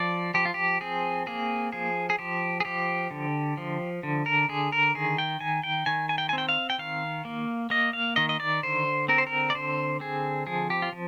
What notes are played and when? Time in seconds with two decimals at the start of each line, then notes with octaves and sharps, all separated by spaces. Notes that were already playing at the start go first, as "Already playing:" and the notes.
Already playing: F3 D5
0.34 F3 G4
0.45 F4
0.54 G4
0.81 C4 G#4
1.27 A#3 G#4
1.72 F3 G#4
2.10 G#4
2.19 F3 G4
2.60 G#4
2.65 F3 G4
3.11 D3
3.57 F3
4.03 D3
4.26 A#4
4.49 D3 G#4
4.72 A#4
4.95 D#3 G#4
5.18 G5
5.40 D#3 G#5
5.63 G5
5.86 D#3 G#5
6.09 G#5
6.18 G5
6.29 G#5
6.33 C4
6.38 G5
6.49 F5
6.70 G5
6.78 D#3 F5
7.25 A#3
7.70 A#3 D#5
7.93 F5
8.16 D#3 D#5
8.29 D#5
8.40 D5
8.63 D3 C5
9.08 C4 A#4
9.18 C5
9.27 A#4
9.50 D5
9.55 D3 C5
10.00 C4 G#4
10.47 F3 G#4
10.70 G4
10.82 F4
10.92 F3